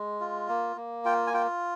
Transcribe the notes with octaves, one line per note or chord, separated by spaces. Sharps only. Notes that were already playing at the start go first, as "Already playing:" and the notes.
Already playing: G#3
F4
A#3
A#3
F4 G5
G#5
F4 G5